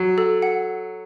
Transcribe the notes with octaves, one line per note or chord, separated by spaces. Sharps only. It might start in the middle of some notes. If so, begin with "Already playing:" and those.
Already playing: F#3
A4
F#5